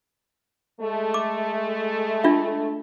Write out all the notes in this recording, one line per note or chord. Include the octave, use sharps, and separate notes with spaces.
G#3 A3
D6
D4 F4 E5